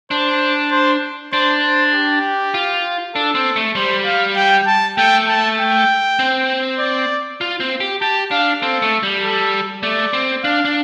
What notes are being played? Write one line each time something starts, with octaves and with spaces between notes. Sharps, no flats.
D4 C5
C5
D4 C5
C5
G4
F4
D4 A4
C4
A3
G3 C5
F5
G5
A5
A3 G5
A5
G5
C4
D5
F4
C4
G4
G4 A5
D4 F5
C4 A4
A3
G3
A4
A3 D5
C4
D4 F5
D4